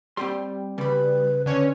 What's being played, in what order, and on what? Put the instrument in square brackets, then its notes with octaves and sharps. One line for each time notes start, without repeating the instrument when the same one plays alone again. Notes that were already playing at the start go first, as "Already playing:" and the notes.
[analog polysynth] G3 [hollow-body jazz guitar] C4 G4 C6
[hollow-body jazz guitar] C#3 B5 [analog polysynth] G3 [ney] B4
[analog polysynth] D3 C#4 C#5 [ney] B4